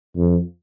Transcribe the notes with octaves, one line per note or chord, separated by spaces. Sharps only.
F2